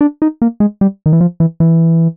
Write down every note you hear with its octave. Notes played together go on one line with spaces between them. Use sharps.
D4
D#4
A#3
G#3
G3
D#3
E3
F3
E3
E3